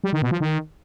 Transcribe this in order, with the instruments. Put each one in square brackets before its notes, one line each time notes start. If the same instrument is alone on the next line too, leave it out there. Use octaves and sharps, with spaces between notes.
[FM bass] G3
D#3
B2
F3
D#3